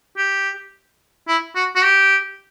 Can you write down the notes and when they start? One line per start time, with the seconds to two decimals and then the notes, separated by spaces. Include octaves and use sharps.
0.17 G4
1.28 E4
1.55 F#4
1.76 F#4
1.84 G4